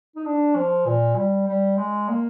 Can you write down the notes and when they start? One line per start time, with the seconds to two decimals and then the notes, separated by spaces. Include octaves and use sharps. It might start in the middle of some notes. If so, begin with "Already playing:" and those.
0.16 D#4
0.25 D4
0.55 F3
0.86 A#2
1.16 G3
1.47 G3
1.77 G#3
2.09 A#3